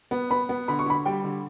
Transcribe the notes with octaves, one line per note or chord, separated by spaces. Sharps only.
B3
B3 B5
B3
D3 B5
C#6
D3 B5
G3 G5
D3